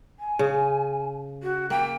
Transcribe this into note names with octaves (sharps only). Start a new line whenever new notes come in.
G#5
C#3
F#4
A#3 G5